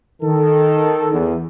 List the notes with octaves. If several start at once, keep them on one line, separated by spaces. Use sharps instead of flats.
D#3 A4
E2